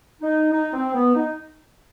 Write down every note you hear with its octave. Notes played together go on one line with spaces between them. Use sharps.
D#4
D#4
C4
B3
D#4